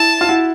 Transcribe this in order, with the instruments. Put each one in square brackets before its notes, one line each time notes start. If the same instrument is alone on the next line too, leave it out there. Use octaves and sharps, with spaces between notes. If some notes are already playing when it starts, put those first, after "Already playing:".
Already playing: [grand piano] E4 [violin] A5
[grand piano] F4
E4 F#4